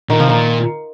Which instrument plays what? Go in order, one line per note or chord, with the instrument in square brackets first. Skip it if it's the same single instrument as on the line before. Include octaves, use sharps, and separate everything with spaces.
[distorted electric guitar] A#2 [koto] D#3
[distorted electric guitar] C3 [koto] F3
[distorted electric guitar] A#2 [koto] D#3